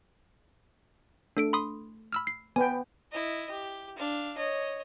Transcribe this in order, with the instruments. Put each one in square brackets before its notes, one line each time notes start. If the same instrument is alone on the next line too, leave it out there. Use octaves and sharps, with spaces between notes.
[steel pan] A3 [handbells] D4 A4 D7
[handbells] B5 C6 D#6
B5 E6 F6
C7
[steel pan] B3 B4 G5 [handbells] G#5
[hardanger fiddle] E4 D#5
G4
D4 F5
C#5 D#5